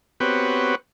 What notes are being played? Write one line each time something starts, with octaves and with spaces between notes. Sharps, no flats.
B3 C4 F#4 G4 B4 C#5